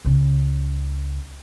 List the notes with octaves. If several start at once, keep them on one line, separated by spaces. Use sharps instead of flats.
C#2 C#3